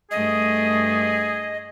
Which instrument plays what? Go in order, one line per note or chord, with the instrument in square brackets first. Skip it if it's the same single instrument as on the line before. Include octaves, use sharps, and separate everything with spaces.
[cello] G2 A3 [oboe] G#4 [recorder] D#5